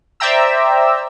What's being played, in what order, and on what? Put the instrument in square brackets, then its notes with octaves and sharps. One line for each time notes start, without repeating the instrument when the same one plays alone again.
[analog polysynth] C5 D5 E5 G5 A#5 E6